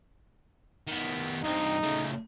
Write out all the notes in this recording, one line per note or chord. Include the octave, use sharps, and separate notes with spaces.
D#3 B3
G2 C4 D#4
C#3 A3